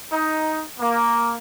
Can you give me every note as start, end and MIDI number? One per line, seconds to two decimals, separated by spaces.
0.12 0.63 63
0.80 1.38 58